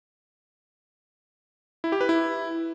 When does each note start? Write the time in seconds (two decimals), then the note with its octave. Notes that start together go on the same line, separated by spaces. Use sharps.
1.84 E4
1.92 G4
2.01 B4
2.09 E4